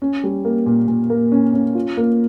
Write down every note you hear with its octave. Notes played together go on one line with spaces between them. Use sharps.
C#4
G3
A#3
A#2
A#2
A#3
C#4
C#4
F4
A#3